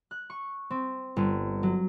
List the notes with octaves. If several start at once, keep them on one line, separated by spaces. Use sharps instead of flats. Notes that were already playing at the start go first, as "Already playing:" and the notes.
F#6
C#6
C4
G1
F#3